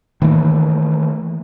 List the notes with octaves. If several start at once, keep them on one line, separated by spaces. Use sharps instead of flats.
D#3 E3 A3 A#3